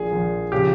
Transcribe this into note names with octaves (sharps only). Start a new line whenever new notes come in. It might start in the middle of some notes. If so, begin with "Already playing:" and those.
Already playing: A#1 A#2 F3 G#4
A#1 A#2 F3
C#3 F3 G4